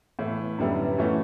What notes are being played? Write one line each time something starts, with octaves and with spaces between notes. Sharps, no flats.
A2 E3 B3 E4
F#2 D3 G3 B3 E4
E3 A3 C#4 F#4